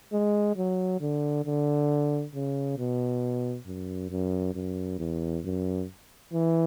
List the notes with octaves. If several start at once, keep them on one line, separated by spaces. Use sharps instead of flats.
G#3
F#3
D3
D3
C#3
B2
F#2
F#2
F#2
E2
F#2
E3